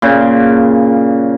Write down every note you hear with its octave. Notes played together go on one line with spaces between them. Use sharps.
A#2 C#3